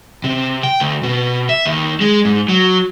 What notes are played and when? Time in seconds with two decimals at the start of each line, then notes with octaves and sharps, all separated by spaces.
0.24 C3
0.63 G5
0.80 D2
1.03 B2
1.49 E5
1.66 D#2
2.01 G#3
2.25 G#2
2.49 F#3